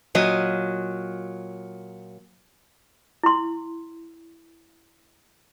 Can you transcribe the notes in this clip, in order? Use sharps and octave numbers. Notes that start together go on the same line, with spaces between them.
A#2 F#3 D#5
E4 C6